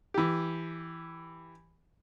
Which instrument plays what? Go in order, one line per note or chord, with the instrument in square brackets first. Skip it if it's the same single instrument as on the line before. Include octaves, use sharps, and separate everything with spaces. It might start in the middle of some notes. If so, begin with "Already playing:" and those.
[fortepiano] E3 G4